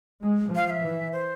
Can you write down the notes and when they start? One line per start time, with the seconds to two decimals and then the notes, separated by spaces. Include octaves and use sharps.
0.21 G#3
0.51 F3 F5
0.67 F5
0.70 E5
0.82 E3
1.13 C5